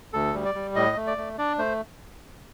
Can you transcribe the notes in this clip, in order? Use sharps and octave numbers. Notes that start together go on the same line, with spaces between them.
D2 A4
G3
D5
G3
A2 D#5
A3
D5
A3
D4 D5
A3 C5